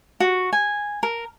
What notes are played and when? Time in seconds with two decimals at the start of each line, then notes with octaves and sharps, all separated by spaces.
0.20 F#4
0.53 G#5
1.03 A#4